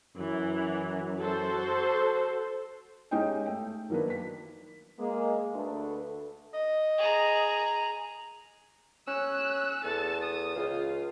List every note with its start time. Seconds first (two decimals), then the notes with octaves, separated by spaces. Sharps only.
0.17 F#2 E3
1.18 F#4 A4 C5
3.11 G#3 C#4 D#4 G4 D#5 G5
3.46 A3 G5
3.90 D#3 F#3 A#3 D4 B4
4.10 B6
4.99 G#3 A#3
5.55 D2 D3 A3 A4 B4
6.54 D#5
6.98 G#4 A#5
9.08 C#4 E6 F#6
9.84 E2 A4 A5
10.22 D#6
10.56 C#2 F4